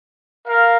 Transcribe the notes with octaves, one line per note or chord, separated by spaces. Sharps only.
A#4 F5